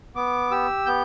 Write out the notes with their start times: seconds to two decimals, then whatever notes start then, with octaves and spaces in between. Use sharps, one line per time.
0.15 B3 D6
0.51 G4 E6
0.86 B3 G6